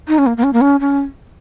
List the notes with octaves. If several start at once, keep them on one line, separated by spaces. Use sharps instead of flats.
D#4
C#4
A#3
A#3
C#4
A#3
C#4
C#4